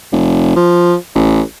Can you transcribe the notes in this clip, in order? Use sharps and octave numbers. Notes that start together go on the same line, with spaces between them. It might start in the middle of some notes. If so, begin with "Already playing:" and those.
F1
F3
A1